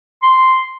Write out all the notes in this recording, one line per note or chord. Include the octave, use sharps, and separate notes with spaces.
C6